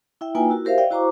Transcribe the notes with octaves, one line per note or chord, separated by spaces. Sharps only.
E4 E5 G5
A#3 D#4 F4 B4 G5 G#5
E4 F#4 A#4
G4 A#4 C5 E5 F5
D5 D#5 F5 G5
E4 F#4 C5 A#5 C#6 D6